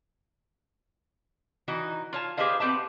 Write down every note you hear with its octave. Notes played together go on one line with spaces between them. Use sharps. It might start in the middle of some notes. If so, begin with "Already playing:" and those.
E3 D#4 F#4
F4 C#5 A5
G4 G#4 B4 C5 D#5 F5
B3 C4 G4 E5 A5